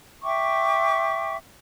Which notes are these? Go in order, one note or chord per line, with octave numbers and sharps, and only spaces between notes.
E5 G5 C#6 D6